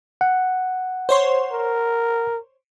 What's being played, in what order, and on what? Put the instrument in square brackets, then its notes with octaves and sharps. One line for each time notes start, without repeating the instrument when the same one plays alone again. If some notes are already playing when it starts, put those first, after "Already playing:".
[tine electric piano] F#5
[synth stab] C5 C#5 C6
[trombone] A#4